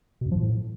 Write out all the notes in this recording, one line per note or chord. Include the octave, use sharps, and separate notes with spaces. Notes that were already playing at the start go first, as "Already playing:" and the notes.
B2
F#2
F3
A#2
A2